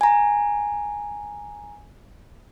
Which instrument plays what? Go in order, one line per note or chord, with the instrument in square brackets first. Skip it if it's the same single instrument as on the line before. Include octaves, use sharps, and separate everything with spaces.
[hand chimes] G#5 A#5